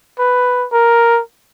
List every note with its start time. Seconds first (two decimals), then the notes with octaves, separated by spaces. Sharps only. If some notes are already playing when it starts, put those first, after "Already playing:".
0.19 B4
0.72 A#4